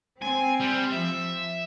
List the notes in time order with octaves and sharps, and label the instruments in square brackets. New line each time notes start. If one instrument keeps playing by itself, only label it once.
[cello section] C4 [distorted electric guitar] G#5
[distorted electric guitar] G3
[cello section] F3 [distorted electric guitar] E5